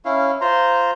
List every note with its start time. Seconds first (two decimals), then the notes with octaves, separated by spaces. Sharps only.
0.05 C#4 E4 F5
0.41 F4 C5 A#5 C6